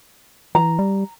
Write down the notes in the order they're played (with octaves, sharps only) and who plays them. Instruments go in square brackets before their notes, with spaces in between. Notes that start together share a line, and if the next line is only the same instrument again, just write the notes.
[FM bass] E3 [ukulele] A#5
[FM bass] G3